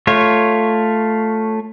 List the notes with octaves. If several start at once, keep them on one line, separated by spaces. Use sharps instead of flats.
A3 F4 C#5